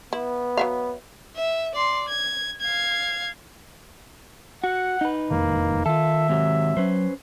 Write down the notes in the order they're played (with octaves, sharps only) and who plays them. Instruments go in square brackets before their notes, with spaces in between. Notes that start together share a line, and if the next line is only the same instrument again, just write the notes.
[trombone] B3 [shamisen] E4
[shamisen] F#3 E5 F5
[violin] E5
D5 C6
G#6
F5 G#6
[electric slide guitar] F#4 [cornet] F#5
[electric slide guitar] D#4 B4
[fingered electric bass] E1 F2 D#3 [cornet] A#3
[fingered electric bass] D#3 [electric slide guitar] F4 A4 [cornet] E5
[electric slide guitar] G#2 C3 F#3
[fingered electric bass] F#3 [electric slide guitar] C#4 B4 C5